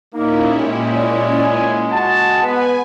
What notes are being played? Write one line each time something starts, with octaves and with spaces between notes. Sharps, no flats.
A#2 A#3 C#4 D#4 E4
G#3 G4
D5
G#5
F#4 F#5 A5
B3 B4 G#5